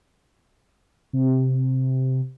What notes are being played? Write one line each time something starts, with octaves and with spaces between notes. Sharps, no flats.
C3